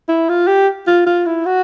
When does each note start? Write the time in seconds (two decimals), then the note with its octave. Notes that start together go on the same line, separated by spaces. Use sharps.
0.09 E4
0.29 F4
0.47 G4
0.87 F4
1.06 F4
1.26 E4
1.46 F#4